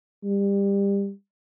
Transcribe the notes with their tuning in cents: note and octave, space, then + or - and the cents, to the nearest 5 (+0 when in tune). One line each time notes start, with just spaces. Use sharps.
G3 +25